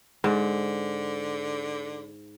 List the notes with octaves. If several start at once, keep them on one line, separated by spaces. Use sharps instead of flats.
G#2 D3